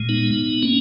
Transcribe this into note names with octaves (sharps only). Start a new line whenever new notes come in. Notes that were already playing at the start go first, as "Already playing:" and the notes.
Already playing: A#2 G#3
B3 D#4
A#3 C#4